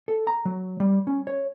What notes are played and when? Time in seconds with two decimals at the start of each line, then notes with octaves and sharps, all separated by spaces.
0.08 A4
0.27 A#5
0.45 F#3
0.80 G3
1.07 C#4
1.27 C#5